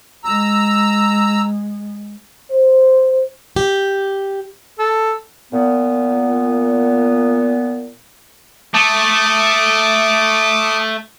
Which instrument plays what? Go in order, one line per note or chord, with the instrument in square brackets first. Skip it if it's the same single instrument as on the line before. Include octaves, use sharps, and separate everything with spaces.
[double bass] G#3 [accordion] A#5 E6
[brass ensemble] C5
[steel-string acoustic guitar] G4
[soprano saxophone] A4
[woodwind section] A#2 B3
[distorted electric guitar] A3 [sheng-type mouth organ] A5 D6 D#6